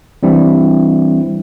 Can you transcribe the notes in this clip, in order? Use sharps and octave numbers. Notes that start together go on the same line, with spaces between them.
E3 G3 C4 D4 E4